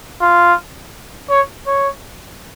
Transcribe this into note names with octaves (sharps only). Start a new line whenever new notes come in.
F4
C#5
C#5